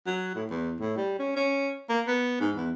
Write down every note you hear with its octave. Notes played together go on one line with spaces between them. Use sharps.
F#3
A2
E2
A2
G3
C#4
C#4
A#3
B3
G#2
E2